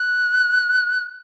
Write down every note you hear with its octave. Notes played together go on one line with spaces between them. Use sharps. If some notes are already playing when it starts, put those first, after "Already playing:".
Already playing: F#6